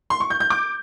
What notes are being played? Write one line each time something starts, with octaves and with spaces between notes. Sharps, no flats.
C6
C#6
G6
G6
D6